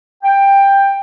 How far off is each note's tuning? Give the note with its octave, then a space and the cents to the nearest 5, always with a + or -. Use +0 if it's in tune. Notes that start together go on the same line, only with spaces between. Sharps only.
G5 +15